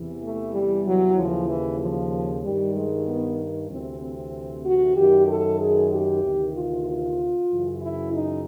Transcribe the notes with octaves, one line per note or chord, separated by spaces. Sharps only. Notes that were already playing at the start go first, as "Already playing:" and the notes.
Already playing: E2 C3 E3
A3
G3
F#3
D#2 C#3 E3 F3
E3
F3
G2 D#3 G3
G#3
B3
D2 C3 E3 C4
C4
F#4
F#2 D#3 G4
A4
G#4
G4
D2 C3 D#3
F4
F4
F#2 C#3 E3
E4
D#4